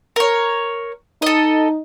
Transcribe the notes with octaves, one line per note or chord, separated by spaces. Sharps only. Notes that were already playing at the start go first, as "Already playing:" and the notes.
A#4 C#5
D#4 A4 D#5